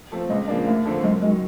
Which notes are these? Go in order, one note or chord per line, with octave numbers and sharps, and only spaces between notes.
F3 A3 C4
C#2 G#3
C#3 F3 A#3 D4
D#2 A3
D3 F3 A3 C4
F#2 G#3
D#3 F#3 G#3